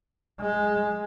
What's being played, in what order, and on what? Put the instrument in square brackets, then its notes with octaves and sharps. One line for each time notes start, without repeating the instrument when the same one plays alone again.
[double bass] G#3